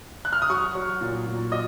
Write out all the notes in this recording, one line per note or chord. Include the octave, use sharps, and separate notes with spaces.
F#6
F6
D#6
F#3 C#6
F#3
A#2
A#2
F#3 D#5